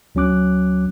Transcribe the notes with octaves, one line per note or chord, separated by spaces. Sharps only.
D2 F#3 C#4 D6 F#6